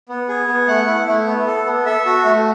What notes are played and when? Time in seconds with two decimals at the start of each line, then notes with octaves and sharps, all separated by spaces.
0.09 B3
0.29 G#4
0.48 B3
0.68 A3 F#5
0.88 E4
1.07 A3
1.27 B3
1.47 A4
1.66 B3
1.86 A4 E5
2.06 F#4
2.25 A3